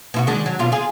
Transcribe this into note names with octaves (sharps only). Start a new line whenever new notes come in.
B2 E4 F#4
D#3 G#3 D4
F#3
B2 D4 F4
F4 G#4